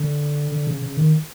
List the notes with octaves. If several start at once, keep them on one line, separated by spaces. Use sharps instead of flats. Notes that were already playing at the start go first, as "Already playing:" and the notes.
Already playing: D3
D3
C#3
C#3
D#3